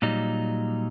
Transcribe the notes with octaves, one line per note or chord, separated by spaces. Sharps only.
A#2 F#3 G3 D#4